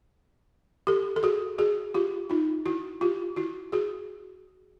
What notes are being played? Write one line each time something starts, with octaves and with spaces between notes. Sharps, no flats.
G4 A4
A4
F#4 G#4
F#4 G#4
F4 G4
D#4 F4
E4 F#4
F4 G4
E4 F#4
F#4 G#4